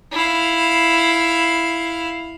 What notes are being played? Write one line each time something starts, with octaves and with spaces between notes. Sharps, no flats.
E4 F5